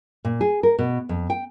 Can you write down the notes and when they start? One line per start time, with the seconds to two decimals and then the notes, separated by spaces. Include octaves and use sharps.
0.25 A#2
0.41 G#4
0.63 A#4
0.78 B2
1.09 F2
1.30 G5